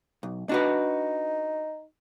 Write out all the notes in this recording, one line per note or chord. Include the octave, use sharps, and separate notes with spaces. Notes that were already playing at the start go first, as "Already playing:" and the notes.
B1
D4 D#4 F#4 B4